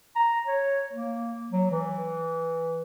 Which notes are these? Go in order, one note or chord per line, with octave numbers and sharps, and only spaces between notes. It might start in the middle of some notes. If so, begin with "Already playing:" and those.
A#5
C#5
A#3
F#3
E3